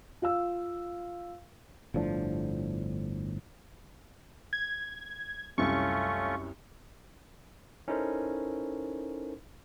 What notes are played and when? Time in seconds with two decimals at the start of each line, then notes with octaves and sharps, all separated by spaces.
0.22 F4 F5 E6
1.94 G1 A2 F3 D4
4.53 G#6
5.58 C2 F#2 A3 C#4 F4 C#6
7.88 C#4 D#4 E4 A4 A#4 C5